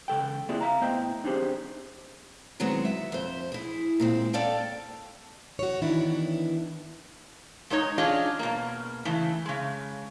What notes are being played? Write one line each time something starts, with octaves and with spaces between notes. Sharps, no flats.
C#3 A4 G5
A#3 C4 E4 F4 G#4 D5
E5 F5 A#5
A2 B3 C5 D#5 G5
C4 D4 D#4 G4 G#4 C5
D#3 F#3 G#3 B3 C4
E5
F2 C5
E4 G#4
A#2 G#3 C4
A4 D5 F5 G5 A5
F#4 C#5
D#3 E3 B3 D4 E4
G#3 A3 D#4 C#5 D#5
C#4 D4 F4 G#4 C#5 D#5
B2 A#3
C#3 E3 A3
C#3 G#3